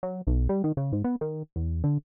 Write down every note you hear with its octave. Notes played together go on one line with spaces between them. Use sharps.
F#3
B1
G3
D#3
C#3
G#2
B3
D#3
E2
D3